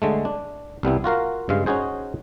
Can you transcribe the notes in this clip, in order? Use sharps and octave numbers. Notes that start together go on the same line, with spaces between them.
D3 G#3 A3
D4
C2 G3 B3 E4
F4 F#4 A#4 F5
G2 C#3 G#3 F5
C#4 D#4 F#4 G#4 C5